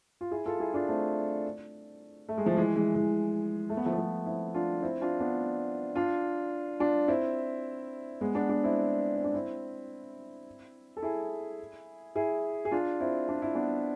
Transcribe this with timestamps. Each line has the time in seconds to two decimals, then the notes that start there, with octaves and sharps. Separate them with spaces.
0.21 F4
0.31 E4 G#4
0.46 F4 A4
0.60 E4 G#4
0.74 D4 F4
0.89 A3 C4
2.29 A3
2.38 G#3
2.46 F3 A3
2.57 E3 G#3
2.76 E3 G#3
2.95 E3 G#3
3.70 A3
3.77 B3
3.86 F3 A3
3.93 B3
3.98 F3 A3
4.26 C4 E4
4.54 D4 F4
4.82 C4 E4
5.01 D4 F4
5.20 B3 D4
5.95 D4 F4
6.80 D4 F4
7.08 C4 E4
8.21 G#3 B3
8.35 B3 D4
8.49 B3 D4
8.63 C4 E4
9.16 C4
9.24 D4
9.34 C4 E4
10.97 A4
11.02 E4 G#4
12.16 E4 G#4
12.65 G#4
12.71 D4 F4
13.00 C4 E4
13.28 D4
13.42 E4
13.55 B3 D4